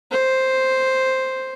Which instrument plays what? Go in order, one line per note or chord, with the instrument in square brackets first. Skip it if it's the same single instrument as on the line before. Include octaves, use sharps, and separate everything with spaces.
[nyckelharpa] C5